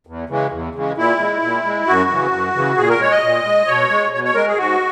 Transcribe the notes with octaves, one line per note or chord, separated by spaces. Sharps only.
E2
C#3 E3 G#3
E2
C#3 E3 G#3
A#2 E4
G#3
A#2
G#3
F#2 F#4
C#3 E3
F#2
C#3 E3
A#2 G#4
A#4
G#3 C#5
D#5
A#2
G#3
B2 C#5
G#3
B2 C#5
C#5
G#3 A#4
G#4
G#2 F#4